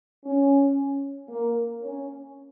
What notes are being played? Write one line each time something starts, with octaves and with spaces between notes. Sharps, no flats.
C#4
A#3
C#4